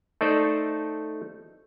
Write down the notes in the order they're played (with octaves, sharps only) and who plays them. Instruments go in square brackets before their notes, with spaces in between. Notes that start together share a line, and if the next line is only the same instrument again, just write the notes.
[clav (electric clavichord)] A3 D#4 A4 C5 D5